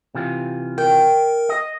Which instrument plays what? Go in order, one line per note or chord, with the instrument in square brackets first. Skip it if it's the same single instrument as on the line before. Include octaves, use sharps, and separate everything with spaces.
[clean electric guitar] C3 E3 F4
[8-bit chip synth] A#4 [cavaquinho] G5
[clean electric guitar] D#5